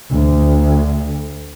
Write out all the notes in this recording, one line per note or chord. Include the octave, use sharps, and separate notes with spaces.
D2